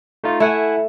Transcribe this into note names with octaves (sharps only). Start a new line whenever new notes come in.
A3 D#4 F4
A3 E4 F#5 G#5